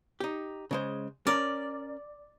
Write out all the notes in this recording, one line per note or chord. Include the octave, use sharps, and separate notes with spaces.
D#4 G4
C#3 G#3 C5
C#4 A#4 D5